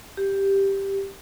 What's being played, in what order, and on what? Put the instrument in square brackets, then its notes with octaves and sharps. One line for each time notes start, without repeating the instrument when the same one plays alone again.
[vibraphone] G4